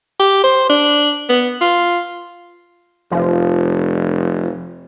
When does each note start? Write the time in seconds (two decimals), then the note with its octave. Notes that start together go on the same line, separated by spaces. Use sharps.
0.19 G4
0.44 C5
0.69 D4
1.29 B3
1.61 F4
3.11 F1 F3